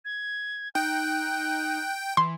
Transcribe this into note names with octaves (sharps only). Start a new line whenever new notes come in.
G#6
D#4 G5 F#6
E3 C6